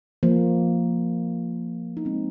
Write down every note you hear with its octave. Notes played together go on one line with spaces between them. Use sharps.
F3 A#3
D#4
G#3 C4